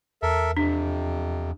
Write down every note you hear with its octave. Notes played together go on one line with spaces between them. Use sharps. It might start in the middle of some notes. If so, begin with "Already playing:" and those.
E2 A4 A#4 E5
F2 C3 D4